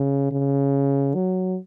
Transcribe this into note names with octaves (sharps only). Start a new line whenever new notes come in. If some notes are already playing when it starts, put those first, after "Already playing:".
Already playing: C#3
C#3
F#3